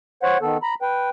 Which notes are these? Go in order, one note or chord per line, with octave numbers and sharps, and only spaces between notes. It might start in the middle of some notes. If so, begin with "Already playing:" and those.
C5 C#5 F#5
D#3 B3 A4
A#5 B5
B4 G5